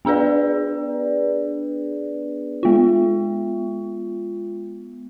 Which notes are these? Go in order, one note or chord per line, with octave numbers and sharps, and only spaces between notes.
B3 D4 G#4 B4 D5
G#3 B3 F4